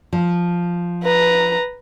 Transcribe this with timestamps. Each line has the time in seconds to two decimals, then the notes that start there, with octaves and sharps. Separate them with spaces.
0.13 F3
1.03 B4 A#5